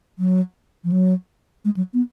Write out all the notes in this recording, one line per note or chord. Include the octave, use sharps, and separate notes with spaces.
F#3
F3
F#3
G#3
F#3
B3